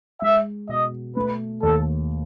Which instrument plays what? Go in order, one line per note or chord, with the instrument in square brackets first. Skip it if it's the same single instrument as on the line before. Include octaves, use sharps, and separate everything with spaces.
[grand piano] G#3 [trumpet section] E5
[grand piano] B2 [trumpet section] D#5
[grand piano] A3 [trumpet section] B4
[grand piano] D#2 [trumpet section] A4